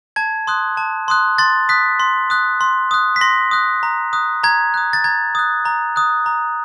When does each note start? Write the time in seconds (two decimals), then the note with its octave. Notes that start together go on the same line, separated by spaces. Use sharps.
0.16 A5 G#6
0.47 C6 D#6 F#6
0.77 A5
1.08 C6 D#6 F#6
1.38 C6 A6
1.69 D#6 F#6 B6
2.00 C6
2.30 D#6 F#6
2.61 C6
2.91 D#6 F#6
3.16 B6
3.21 C6 A#6
3.51 D#6 F#6
3.83 A#5
4.13 D#6 F#6
4.43 A#5 G#6
4.74 D#6 F#6
4.93 A6
5.04 A#5 G#6
5.35 D#6 F#6
5.66 A#5
5.96 D#6 F#6
6.26 A#5